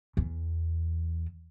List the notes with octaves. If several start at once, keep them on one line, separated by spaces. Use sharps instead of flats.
E2